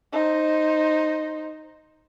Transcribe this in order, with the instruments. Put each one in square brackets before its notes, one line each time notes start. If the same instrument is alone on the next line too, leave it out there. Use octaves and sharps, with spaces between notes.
[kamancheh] D#4 C5